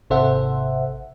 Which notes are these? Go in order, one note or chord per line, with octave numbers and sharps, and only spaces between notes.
G#1 C3 A4 C5 E5 F#5